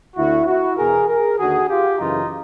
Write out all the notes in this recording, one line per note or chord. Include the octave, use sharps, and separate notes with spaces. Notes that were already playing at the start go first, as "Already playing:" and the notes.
D2 D3 E4 F#4
E4 F#4
E2 B2 G#4 A#4
G#4 A#4
D#2 D3 F#4 G#4
F4 G4
F#2 C#3 E3 D#4 F4